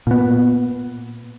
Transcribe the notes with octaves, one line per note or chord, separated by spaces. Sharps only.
A#2 B3